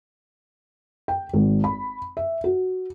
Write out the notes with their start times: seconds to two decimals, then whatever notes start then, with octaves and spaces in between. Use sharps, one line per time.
1.08 G5
1.33 G#1
1.64 B5
2.17 E5
2.44 F#4